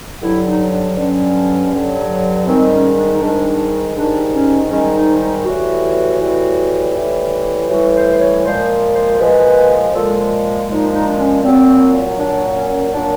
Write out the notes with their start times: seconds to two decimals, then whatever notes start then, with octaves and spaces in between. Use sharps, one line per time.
0.22 G2 D3 F#3 E4
0.46 D#4
0.71 D4
0.97 G2 D3 F#3 C#4
1.71 G2 D3 F#3
2.46 G#2 D#3 G3 C4
2.72 C#4
2.97 D4
3.10 D#4
3.21 G#2 D#3 G3 D4
3.96 G#2 D#3 G3 D4
4.33 C#4
4.70 G#2 D#3 G3 C#4
4.96 D#4
5.21 D#4
5.45 A2 E3 G3 F#4
6.21 A2 E3 G3
6.95 A2 E3 G3
7.70 A2 E3 G3 F#4
7.95 C5
8.11 C5
8.20 C#5
8.44 A#2 F3 G#3 C5
8.94 C5
9.19 A#2 F3 G#3 B4
9.94 A#2 F3 G#3 A4
10.69 A#2 F3 G#3 D#4
10.93 D#4
11.07 D4
11.19 C#4
11.43 A#2 F#3 C4
12.18 A#2 F#3 D4
12.55 C#4
12.92 A#2 F#3 D4